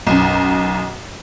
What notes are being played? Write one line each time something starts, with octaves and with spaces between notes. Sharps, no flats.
B1 F#2